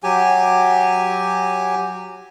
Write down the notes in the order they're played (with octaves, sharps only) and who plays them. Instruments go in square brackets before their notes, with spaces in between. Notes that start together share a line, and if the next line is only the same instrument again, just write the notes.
[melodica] F#3 G4 G#5